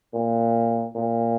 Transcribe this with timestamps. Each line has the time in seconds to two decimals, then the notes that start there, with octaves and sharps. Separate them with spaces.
0.14 A#2
0.96 A#2